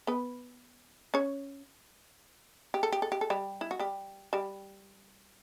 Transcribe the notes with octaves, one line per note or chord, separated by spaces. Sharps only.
B3 B4
C#4 C#5
G4
A4
G4
A4
G4
A4
G3 G4
E4
F#4
G3 G4
G3 G4